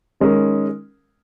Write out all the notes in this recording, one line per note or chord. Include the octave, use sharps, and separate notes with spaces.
D#3 G#3 C#4 A#4